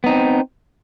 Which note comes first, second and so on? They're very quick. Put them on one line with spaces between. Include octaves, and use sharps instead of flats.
B3 D#4 C4